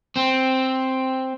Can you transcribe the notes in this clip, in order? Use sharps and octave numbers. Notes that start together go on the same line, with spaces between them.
C4